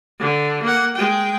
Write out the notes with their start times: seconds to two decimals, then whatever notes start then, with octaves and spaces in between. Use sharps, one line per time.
0.20 D3
0.63 A#3 F#5
0.96 G#3 G5